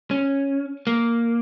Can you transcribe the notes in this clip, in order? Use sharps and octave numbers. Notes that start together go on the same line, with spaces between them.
C#4
A#3